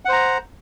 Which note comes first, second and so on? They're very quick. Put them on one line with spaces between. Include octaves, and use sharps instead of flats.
F#5 C5 A#5